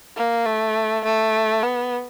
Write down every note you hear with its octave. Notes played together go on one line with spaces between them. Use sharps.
A#3
A3
A3
B3